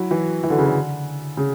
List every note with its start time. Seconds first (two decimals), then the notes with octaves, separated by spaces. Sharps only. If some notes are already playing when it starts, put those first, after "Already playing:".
Already playing: F#3 E4
0.11 E3
0.43 E3
0.50 D3
0.59 C#3
0.66 D3
1.37 C#3